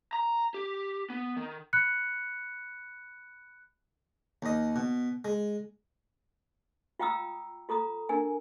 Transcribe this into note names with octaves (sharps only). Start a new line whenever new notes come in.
A#5
G4
B3
D#3
B5 F#6 C#7
D#2 D#5
B2
G#3
F4 F5 G5 A#5 D#6 E6
F4 A4 A#5 D#6
D4 A#4 G#5